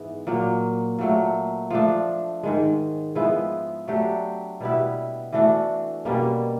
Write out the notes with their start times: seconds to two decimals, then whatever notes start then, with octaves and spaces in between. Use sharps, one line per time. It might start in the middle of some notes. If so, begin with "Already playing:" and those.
Already playing: G#2 E3 B3
0.27 A#2 F#3 A#3
0.99 A#2 F#3 A3
1.70 F3 A3 D4
2.43 G#2 D#3 G#3
3.15 F3 G#3 B3 E4
3.88 F#3 A3 D4 G4
4.61 B2 G3 B3 E4
5.33 E3 A3 D4 F#4
6.05 B2 G3 A#3 C#4